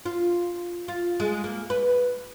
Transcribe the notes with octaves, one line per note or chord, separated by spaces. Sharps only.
F4
F4
G#3
A#3
B4